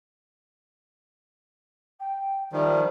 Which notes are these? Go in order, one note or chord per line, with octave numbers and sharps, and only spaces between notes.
G5
D#3 F3 G3 E5